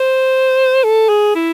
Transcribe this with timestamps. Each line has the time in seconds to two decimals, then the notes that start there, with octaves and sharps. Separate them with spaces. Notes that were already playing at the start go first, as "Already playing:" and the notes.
Already playing: C5
0.83 A4
1.09 G#4
1.35 E4